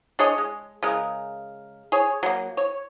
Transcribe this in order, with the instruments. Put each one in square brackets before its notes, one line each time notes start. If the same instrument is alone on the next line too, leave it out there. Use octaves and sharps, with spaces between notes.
[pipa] D4 G#4 C#5 D#5
G#3
C#3 G#3 A#4
G#4 C#5
F#3 A#3
C#5